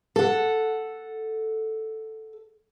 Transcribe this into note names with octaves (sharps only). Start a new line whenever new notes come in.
A4 F#5